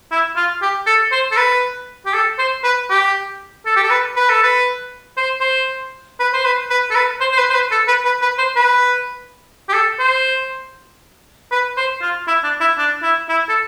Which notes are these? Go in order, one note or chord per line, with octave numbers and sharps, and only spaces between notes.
E4
F4
G4
A4
C5
A4
B4
G4
A4
C5
B4
G4
A4
G4
A4
B4
B4
A4
B4
C5
C5
B4
C5
B4
B4
A4
B4
C5
C5
B4
C5
B4
A4
B4
B4
B4
C5
B4
G4
A4
C5
B4
C5
F4
E4
D4
E4
D4
E4
E4
A4